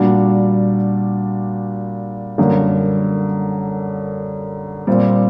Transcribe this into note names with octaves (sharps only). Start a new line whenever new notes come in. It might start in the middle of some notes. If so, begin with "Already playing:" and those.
Already playing: A#2 G3 D4 F#4
F#2 D3 G3 A#3
A#2 G3 C4